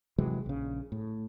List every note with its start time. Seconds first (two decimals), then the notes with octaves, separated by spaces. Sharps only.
0.18 C3 E3 F#3 G#3
0.46 A#1 C#3
0.92 A2